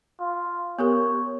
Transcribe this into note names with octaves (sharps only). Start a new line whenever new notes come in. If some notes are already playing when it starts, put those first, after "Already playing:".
F4
B3 G4 A#4 C#5